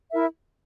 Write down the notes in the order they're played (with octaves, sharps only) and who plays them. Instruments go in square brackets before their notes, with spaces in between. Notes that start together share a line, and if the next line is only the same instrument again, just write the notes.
[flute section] E4 A#4 E5